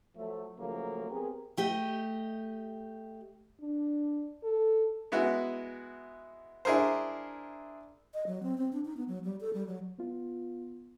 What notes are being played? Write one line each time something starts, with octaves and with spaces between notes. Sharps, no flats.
F3 F#3 A3
C#3 F3 F#3 A3 A#3
B3 C4 G4 G#4 A#4
A3 G4 D#5
D4
A4
G#3 B3 E4 F#4
D4 E4 G#4 A#4 C5
D#5
F#3
C4
C4
D4
D#4
B3
F#3
G3
A4
G3
F#3
B3 F4